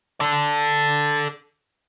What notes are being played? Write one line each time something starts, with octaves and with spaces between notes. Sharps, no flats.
A4 D5